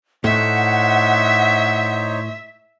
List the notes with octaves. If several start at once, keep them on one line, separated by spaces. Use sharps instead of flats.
A2 A3 D#4 C5 C#5 E5 F#5